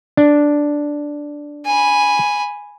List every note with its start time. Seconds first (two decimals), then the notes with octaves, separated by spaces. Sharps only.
0.17 D4
1.66 G#5 B5